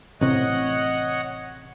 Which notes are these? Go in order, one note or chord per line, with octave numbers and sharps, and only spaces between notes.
A1 C3 C#5 D#5 F#5